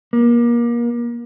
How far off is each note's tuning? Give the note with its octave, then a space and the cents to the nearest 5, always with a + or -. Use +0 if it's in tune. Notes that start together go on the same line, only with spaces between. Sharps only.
A#3 +30